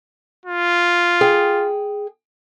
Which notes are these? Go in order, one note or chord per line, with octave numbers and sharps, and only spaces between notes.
F4
G#4 G5